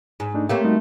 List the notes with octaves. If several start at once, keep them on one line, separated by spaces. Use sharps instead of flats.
G#2
A3 D4 D#4
A3 A#3 C4 G4 C#5
G3 D#4 F#4